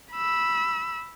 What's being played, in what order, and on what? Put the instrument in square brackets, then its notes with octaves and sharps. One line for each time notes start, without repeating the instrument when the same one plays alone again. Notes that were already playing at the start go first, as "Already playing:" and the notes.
[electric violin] B5 E6